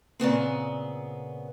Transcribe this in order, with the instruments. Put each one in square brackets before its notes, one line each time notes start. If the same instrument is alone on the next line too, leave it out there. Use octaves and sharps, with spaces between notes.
[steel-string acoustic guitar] A#2 C#3 B3 C4